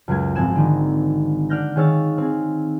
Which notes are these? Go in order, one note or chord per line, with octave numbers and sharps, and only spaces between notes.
C#2 F#2 G#3 G#6
G#1 F3 C4 G#5 F#6 E7
D3 D#3 A#3
D4 F#5 F6 G6 A#6
D#3 G#4 C#5 F5 E6 A6
C4 G#4